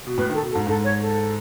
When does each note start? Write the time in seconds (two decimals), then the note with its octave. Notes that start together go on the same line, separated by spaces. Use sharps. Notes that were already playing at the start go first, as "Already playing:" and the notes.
0.07 B2
0.18 A2 B4
0.30 D#3
0.34 A4
0.42 B2
0.51 A4
0.55 G#2
0.67 G#2 A4
0.84 C#5
1.00 A4